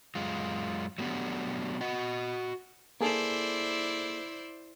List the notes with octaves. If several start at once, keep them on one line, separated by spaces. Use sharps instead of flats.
F#2 G#3 F4
F#3 A3 B3 D4 G4
F#4 D#5 F#5
A#3 E4 G#4 A4 C5 D5